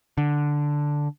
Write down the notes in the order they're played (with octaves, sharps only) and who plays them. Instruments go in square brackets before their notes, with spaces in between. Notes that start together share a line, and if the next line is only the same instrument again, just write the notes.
[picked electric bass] D3